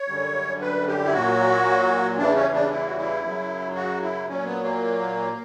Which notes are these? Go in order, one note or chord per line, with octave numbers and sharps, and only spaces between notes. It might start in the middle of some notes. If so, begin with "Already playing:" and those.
Already playing: C#5
F#2 D3 G3
B4
G4
E4
A#2 F#3 F#4
E2 C#3 E3 G3 D4
C#4
D4
E4
F#4
E4
F#2 C#3 F#3
F#4
E4
A#2 F#3 C#4
B3
A#3